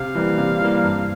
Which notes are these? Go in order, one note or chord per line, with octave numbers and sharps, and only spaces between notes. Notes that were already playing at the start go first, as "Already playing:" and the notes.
Already playing: C3 F5
E3 G3 A#3
C3
E3 G3 A#3
G2